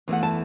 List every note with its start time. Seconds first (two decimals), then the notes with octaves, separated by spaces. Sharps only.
0.08 E2 E3 A3 F#5
0.23 A5